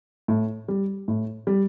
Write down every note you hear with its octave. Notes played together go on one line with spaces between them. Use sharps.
A2
G3
A2
G3